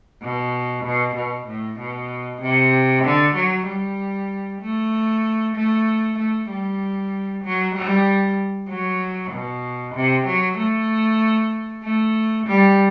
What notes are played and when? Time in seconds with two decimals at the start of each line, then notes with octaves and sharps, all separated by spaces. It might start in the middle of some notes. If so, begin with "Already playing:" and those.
0.22 B2
0.85 B2
1.16 B2
1.47 A2
1.79 B2
2.41 C3
3.05 D3
3.36 F#3
3.67 G3
4.61 A3
5.56 A3
6.19 A3
6.50 G3
7.44 F#3
7.75 G3
8.69 F#3
9.32 B2
9.95 C3
10.27 F#3
10.58 A3
11.84 A3
12.46 G3